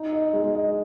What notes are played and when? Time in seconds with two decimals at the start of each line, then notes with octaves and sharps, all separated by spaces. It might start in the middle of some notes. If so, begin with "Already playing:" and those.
Already playing: D#4
0.13 D#5
0.33 G#3
0.55 D#5